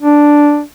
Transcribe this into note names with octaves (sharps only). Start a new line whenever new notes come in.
D4